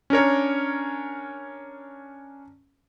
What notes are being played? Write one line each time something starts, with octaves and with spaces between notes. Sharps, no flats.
C#4 D4 A#4 C#5